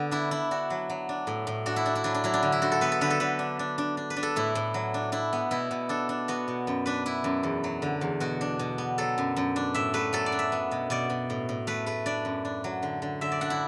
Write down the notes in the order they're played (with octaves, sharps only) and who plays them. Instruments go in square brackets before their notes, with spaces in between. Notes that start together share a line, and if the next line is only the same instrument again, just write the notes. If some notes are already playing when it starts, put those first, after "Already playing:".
Already playing: [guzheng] D3 B3
D4 E4
D4 E4
D4 F#4
F#3
F#3
D4
A2
A2
D4 F#4
E4
D4
E4
F#3 D4
D4
F#3 E4
D4
D3
E4
D3 F#4
A4
B3 B4
A4
D3 B4
A4
D3 B4
D4
D4
D4
D4
B4
D4
A4
A2 E4
A2
F#3
D4
D4 E4
B3
B2 E4
B2
D4 A4
D4
B3 F#4
B2
F#2
D4 B4
D4 E4
F#2
E2
F#3
D3
E2
B2 F#4
D4
B2
B3
F#3 A4
F#2
F#2
D4
A2 E5
A3 B4
F#3 A4
D5
D4
E5
B3
B2
B2 D5
B2
A2
A2
A3 B4
A3 B4
D4 D5
F#2
D4
F#3
D3
D3
D3 E5
D5
D4 F#5
E4